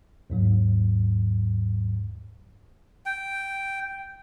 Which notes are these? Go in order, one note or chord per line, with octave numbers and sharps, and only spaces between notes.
D#2 G#2 F#3
G5